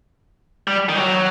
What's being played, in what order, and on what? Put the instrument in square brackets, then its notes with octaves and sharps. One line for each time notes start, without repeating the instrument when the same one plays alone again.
[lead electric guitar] G3
D#3
F#3